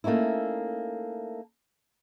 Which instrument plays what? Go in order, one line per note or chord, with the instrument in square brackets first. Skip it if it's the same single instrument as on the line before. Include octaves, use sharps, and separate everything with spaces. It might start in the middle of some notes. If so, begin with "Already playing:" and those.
[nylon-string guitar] A3 A#3 C#4 D#4 E4